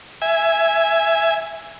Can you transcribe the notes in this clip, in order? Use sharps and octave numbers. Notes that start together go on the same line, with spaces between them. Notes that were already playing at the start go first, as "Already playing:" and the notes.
E5 G#5